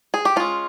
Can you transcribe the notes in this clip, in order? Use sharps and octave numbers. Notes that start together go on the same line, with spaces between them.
G#4
G4
G#3 C#4 F4